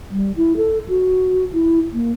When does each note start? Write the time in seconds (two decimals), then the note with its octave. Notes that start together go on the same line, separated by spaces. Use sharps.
0.11 G3
0.37 E4
0.57 A4
0.89 F#4
1.53 E4
1.93 A#3